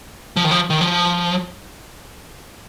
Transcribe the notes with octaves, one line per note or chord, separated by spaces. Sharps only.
F3
D#3
F3
D#3
F3